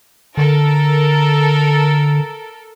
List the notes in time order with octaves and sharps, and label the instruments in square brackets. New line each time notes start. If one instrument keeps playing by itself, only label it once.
[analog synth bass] D3 [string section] A4 A#4